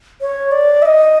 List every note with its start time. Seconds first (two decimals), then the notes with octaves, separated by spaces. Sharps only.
0.21 C#5
0.52 D5
0.82 E5
0.86 D#5